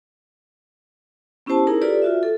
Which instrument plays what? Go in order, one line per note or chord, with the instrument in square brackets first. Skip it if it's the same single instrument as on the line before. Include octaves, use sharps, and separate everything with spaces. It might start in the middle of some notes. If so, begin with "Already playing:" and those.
[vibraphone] B3 C#4 E4 G4 C5 A5
D#4 E4 G#4 A#4 A#5
F4 G4 A4 B4 D5
F4 F#4 E5
A4